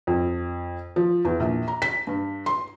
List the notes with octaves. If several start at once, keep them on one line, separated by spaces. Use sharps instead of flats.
F2
F3
E2
A#1
A#5
B6
G2
C6